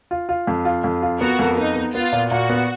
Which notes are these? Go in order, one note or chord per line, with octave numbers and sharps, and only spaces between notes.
F4
F4
F2
F4
F2
F4
B3 F#4 A#4
F2
B3 D#4
B3
B3 F4
A#2
A#2 F#4
B3